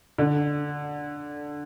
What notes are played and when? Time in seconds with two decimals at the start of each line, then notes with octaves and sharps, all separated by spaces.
0.18 D3